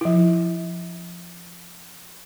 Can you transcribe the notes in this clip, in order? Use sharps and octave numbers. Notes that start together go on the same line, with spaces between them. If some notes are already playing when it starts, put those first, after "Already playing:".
F3 E4